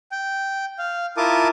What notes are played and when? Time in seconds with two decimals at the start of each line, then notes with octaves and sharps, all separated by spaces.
0.12 G5
0.79 F5
1.17 E4 F4 A#4 A5 D6 D#6